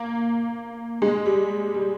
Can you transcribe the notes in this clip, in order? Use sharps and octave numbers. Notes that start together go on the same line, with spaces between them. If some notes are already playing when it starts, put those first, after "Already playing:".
Already playing: A#3
G#3
G3
G3